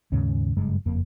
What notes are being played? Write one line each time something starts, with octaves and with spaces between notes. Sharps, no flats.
D#2 G#2 C#3 C#4
F#1 G2 G#3
F#1 F2 A#3